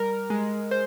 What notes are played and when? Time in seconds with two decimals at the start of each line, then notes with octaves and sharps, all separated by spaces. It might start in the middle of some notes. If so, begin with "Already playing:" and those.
Already playing: G3 A#4
0.30 G#3
0.71 C5